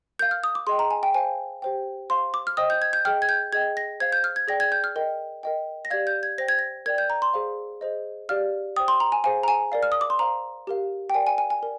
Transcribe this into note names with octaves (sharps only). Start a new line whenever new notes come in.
A#4 F5 G6
F6
D#6
D6
G#4 D#5 G5 C6
A#5
G#5
G5
C5 F5 G#5
G4 C5 G5
C5 F5 C6
D6
F6
C5 D#5 G5 D#6
G6
G#6
G6
G#4 D#5 G5 F6
G#6
G6
G#4 D#5 G5 G#6
A#6
C5 F5 G#6
G6
F6
G#6
G#4 D5 G5 A#6
G#6
G6
F6
A#4 D#5 G5
A#4 D#5 G5
A#6
G4 D5 F5 G#6
G6
G#6
C5 G5 A#6
G#6
A#6
A#4 D5 G5 G#6
G6
A#5
C6
G#4 C5 F5
G#4 C5 D#5
G4 D5 F5 F6
C5 G5 D#6
C6
A#5
G#5
G#4 C5 F5 G#5
A#5
G#5
A#4 D5 F5
F6
D#6
D6
C6
C5 F5 A#5
G4 A#4 F5
G5
A#4 D5 F5 G#5
G#5
G#5
G#5
A#4 D5 G5